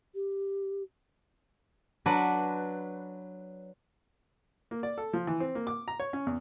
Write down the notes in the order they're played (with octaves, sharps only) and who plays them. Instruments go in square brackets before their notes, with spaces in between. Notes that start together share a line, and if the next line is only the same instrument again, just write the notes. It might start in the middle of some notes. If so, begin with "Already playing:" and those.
[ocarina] G4
[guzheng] F#3 D4 B4
[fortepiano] A#3
D5
A4
F3
E3
C4
A#3
D6
A#5
C#5
C#4
E2